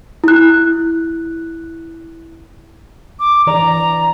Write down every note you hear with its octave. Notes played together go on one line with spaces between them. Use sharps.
E4 F#6
D6
E3 D5 A#5